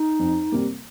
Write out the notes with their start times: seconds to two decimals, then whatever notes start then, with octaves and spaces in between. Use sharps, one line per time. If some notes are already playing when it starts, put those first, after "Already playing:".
Already playing: D#4
0.19 F2
0.52 C3 G3 A#3